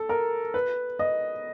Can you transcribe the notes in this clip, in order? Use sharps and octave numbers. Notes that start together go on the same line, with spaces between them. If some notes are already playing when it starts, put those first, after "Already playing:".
Already playing: A4
A#4
B4
D#5